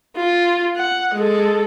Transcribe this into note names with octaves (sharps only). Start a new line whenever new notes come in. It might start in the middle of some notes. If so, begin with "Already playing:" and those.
F4
F#5
G#3 A4